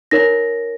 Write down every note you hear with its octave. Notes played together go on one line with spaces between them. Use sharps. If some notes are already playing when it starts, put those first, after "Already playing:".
D#4 A#4 C#5 A#6